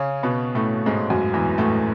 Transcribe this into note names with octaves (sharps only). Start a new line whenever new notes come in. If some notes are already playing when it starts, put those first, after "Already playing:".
Already playing: C#3 C#4
B2 B3
A2 A3
G#2 G#3
F#2 F#3
E2 E3
A2 A3